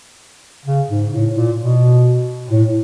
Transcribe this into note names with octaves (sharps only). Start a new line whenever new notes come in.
C#3
G#2
A2
A#2
B2
A2